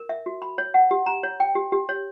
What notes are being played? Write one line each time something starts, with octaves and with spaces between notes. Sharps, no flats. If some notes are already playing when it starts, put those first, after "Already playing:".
Already playing: A#4
E5
F#4
B5
C#5
F#5
G4
A#5
C#5
G5
G4
G4
C#5